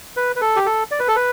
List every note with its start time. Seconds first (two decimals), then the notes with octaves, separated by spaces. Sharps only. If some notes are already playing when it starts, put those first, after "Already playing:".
0.17 B4
0.36 B4
0.41 A4
0.56 G4
0.66 A4
0.91 D5
1.00 B4
1.08 A4
1.16 B4